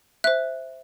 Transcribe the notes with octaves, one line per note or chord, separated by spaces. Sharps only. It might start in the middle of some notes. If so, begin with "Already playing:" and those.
C5 E5 F#6